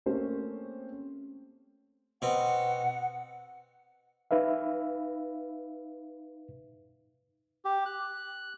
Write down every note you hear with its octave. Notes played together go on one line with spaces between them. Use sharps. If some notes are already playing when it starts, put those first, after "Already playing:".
A3 A#3 C4 C#4 G4 C5
B2 C4 F#5
D#4 B4 E5 F5
G4
F#6